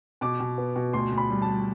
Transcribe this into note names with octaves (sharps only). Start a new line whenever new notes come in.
B2 D6
B2
B3
B2
D2 C6
D2
B5
G3
A5
G3